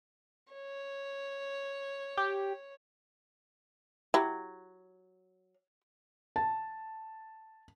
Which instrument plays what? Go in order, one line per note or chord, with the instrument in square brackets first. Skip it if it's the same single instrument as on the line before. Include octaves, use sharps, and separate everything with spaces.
[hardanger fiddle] C#5
[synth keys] G4
[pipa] F#3 [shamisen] E4 G4
[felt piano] A5